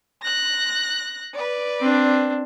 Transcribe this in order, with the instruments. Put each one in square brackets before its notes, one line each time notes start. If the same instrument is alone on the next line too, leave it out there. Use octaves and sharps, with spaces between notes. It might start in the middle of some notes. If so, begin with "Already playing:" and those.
[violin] F#6 A#6
B4 D5
[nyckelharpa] C4 D4